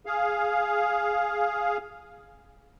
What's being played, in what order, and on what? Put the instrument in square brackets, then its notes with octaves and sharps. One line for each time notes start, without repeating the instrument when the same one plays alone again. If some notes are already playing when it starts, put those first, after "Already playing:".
[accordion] G#4 F5